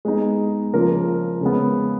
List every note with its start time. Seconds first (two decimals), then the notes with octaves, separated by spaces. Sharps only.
0.05 G#3 B3 D#4 G#4
0.74 C#3 F3 A#3 F4 A#4
1.41 C#3 G#3 B3